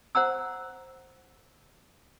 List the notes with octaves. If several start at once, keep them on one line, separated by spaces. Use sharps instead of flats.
C5 F#5 A#5 E6